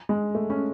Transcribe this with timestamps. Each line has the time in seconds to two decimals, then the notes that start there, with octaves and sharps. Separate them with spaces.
0.09 G#3
0.35 A3
0.50 C#4